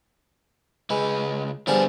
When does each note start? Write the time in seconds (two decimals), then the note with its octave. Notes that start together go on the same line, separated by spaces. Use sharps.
0.90 C#2 G#3 B4
1.67 D3 F3 G3 B3 G#4